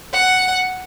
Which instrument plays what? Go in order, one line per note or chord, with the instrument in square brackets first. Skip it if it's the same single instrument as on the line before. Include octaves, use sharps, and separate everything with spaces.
[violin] F#5